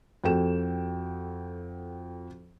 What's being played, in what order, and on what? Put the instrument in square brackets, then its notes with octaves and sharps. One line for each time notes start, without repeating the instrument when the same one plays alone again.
[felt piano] F2 F#4 A4 G5 E7